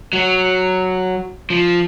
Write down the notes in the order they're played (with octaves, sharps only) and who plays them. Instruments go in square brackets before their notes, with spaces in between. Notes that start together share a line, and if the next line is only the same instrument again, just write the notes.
[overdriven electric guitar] F#3
F3